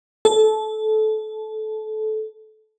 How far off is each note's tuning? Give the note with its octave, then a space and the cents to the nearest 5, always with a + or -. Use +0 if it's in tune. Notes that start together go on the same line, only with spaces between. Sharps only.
A4 -20